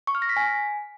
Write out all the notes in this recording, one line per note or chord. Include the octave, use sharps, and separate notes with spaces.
C#6
F6
A#6
B6
G#5